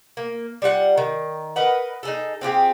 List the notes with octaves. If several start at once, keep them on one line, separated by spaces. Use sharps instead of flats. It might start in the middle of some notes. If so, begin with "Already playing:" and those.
A#3
G3 F4 F#4 F#5
D#3
A#4 B4 D#5 F#5
D#4 G#4 A4
C4 F4 G4 G#4